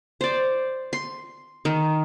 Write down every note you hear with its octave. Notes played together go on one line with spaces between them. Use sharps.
C5 D5
C6
D#3